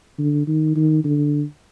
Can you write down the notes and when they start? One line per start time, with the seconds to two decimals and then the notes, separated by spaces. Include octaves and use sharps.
0.19 D3
0.47 D#3
0.76 D#3
1.04 D3